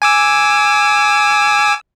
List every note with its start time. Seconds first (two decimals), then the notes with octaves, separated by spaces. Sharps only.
0.02 G#5 D6 E6